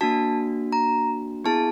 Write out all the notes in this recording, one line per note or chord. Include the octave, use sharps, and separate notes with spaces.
A#3 D4 F#4 A5
A#5
B3 E4 G#4 A5